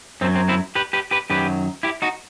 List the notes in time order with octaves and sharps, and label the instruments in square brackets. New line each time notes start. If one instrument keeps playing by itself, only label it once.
[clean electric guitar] F#2 F#3 C4
C4
C4 E4
G4 B4
G4 B4
G4 B4
F#2 D#3 F#3 G4 B4
E4 G4
D#4 F#4